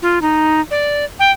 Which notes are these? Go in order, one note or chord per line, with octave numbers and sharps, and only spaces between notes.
F4
D#4
D5
G5